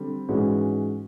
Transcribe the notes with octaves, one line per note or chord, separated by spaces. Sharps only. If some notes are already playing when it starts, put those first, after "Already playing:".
Already playing: D3 G3 C4
G#2 E3 G#3 C#4 F#4